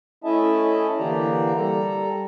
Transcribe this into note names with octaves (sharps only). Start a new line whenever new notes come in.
A3 C#4 E4 D#5 E5 A5
D3 E3 A#3 G4 D5 A#5
G3 A4 A#5